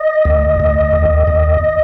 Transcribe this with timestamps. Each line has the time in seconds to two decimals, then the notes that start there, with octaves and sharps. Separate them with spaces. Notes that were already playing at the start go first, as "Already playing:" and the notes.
Already playing: D#5
0.25 D2
0.60 D2
0.93 D#2
1.27 D#2